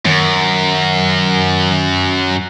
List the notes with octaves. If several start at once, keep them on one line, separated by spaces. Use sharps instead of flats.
F#2 D#3